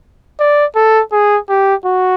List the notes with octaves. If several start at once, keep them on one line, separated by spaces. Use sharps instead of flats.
D5
A4
G#4
G4
F#4